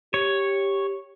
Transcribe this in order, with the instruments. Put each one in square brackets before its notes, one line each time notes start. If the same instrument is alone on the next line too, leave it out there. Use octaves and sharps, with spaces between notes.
[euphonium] G4 [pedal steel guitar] C#5